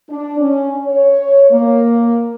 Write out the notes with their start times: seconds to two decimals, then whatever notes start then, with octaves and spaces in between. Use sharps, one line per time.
0.10 D4
0.39 C#4
0.85 C#5
1.51 A#3